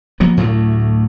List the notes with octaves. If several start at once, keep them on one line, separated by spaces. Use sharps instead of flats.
F3 F#3 A#3 B3
D2 A2 F#3 A3